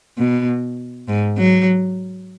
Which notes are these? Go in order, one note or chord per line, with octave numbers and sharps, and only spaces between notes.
B2
G#2
F#3